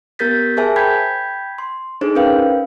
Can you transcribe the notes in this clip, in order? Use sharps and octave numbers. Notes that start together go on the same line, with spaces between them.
B3 G4 A#4 G6 A6 B6
G#4 A#4 C5 E5 G#5 A5
G5 B5 G6 G#6 B6
C6
D4 D#4 G#4 A4 C5
C#4 A#4 B4 F5 G5